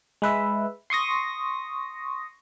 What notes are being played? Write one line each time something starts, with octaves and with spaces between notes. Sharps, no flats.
G#3 B4 E5
C6 C#6 D#6 A#6